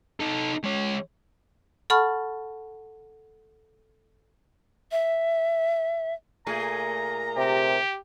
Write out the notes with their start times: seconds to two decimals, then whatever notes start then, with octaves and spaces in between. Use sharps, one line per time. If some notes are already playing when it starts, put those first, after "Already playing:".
0.20 D#4 A4
0.64 G#3 C#5
1.90 A4 F#5 A5 B5 C#6 F6
4.92 E5
6.47 A#2 A3 G#4 A#5
7.37 C3 G4